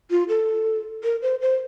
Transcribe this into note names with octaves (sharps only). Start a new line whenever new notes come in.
F4
A4
A#4
C5
C5